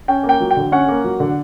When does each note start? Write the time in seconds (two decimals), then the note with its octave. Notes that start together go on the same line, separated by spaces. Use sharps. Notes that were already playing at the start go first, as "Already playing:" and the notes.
0.08 C#4 G5
0.23 A#3
0.29 G5
0.40 F#3
0.51 G5
0.57 D3
0.72 C#4 F#5
0.88 A#3
1.04 F#3
1.20 D3